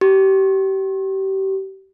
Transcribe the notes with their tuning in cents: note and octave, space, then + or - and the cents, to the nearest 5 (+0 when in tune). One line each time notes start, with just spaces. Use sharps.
G4 -30